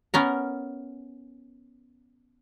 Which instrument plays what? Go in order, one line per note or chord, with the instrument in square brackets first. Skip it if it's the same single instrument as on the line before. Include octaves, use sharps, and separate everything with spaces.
[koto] B3 C#4 A#4